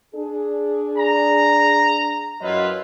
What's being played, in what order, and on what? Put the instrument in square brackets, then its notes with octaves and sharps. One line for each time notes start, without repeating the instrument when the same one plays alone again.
[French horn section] D4 G#4
[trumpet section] A#5
[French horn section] F#2 F#3 D#5 [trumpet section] E4 F4 B4